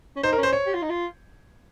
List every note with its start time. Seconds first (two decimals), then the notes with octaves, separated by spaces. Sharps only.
0.16 C#4
0.23 D#4 C5
0.33 A#4
0.38 C#4
0.43 C5
0.53 C#5
0.67 G4
0.74 F4
0.82 D#4
0.90 F4